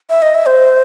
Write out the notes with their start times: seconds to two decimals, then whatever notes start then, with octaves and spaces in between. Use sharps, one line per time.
0.10 E5
0.22 D#5
0.35 E5
0.46 C5